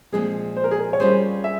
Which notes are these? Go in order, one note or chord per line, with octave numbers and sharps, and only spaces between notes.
A#2 F3 G#3 C4 G#4
C5
A#4
G#4
A#4
C#5
G3 C#4 F4 G#4 C5
E5